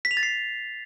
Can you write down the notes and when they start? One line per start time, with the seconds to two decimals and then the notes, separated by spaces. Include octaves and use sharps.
0.05 B6
0.11 F7
0.17 A6
0.23 C7